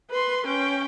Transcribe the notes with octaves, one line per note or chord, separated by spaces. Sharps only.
B4 C6
C#4 G5